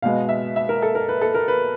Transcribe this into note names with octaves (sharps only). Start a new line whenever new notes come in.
B2 G#3 B3 F5
E5
E5
A#4
A4
A#4
B4
A4
A#4
B4